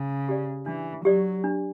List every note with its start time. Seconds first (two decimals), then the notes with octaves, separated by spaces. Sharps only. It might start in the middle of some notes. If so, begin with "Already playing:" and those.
Already playing: C#3
0.29 G4 D5
0.66 E3 D4
1.05 F#3 G4 D5
1.44 D4